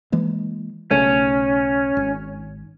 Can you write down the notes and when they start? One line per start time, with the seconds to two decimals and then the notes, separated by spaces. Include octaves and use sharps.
0.12 E3 G#3 A#3
0.91 B1 C#3 A3 C#4
1.97 G#1